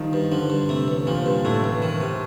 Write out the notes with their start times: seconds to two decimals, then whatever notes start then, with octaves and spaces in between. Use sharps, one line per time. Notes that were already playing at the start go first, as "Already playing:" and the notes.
Already playing: D#3 F3 G3
0.13 G2
0.32 D3 F3
0.50 G2
0.69 C3 A3
0.88 A1
1.07 A#2 F3
1.26 G2
1.44 A2 A3
1.64 A1
1.82 D#3
2.01 C3